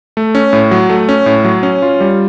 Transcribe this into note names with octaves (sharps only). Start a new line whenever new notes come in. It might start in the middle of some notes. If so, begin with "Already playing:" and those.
A3
C#4
A2
F#3
A3
C#4
A2
F#3
C#4
F4
G3